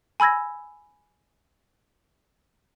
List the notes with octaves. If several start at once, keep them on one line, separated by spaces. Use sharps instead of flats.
G#5 B5 E6 G#6 A#6